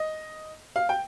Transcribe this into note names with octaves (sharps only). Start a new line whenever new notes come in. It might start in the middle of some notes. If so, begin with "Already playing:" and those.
Already playing: D#5
F5
G5